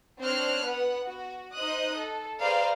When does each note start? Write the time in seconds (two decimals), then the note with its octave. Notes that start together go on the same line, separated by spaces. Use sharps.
0.20 C4 D4 C5 C#5 F6 F#6
0.64 B3 B4 F#5
1.06 F#4
1.55 D#4 C5 D#5 D#6 F#6
1.96 A4
2.40 G#4 B4 C5 D5 F5 A#5